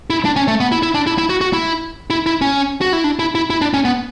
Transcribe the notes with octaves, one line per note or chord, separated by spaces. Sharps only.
E4
D4
C#4
A3
B3
E4
E4
D4
E4
E4
F#4
F#4
E4
E4
E4
C#4
F#4
E4
D4
E4
E4
E4
D4
C#4
B3